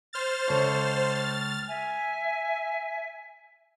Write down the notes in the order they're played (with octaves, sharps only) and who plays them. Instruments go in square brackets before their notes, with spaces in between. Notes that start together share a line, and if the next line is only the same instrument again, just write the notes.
[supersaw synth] C5 F6 A6
[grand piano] C#2 A4 C#5
[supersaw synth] F6 A6
[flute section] E5 G#5